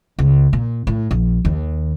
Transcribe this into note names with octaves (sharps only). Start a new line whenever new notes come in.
C#2
A#2
A2
A#1
D#2